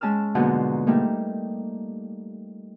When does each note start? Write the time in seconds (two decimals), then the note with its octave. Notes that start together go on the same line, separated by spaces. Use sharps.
0.01 G#3 C#4 A5 E6 F6
0.35 G#2 B2 D3 F3 F#3 A#3
0.87 G3 A3 A#3 D#4